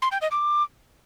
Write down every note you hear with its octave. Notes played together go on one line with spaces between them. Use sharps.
C6
G5
D#5
D6